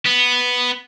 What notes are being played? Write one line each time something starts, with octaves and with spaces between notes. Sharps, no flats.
B3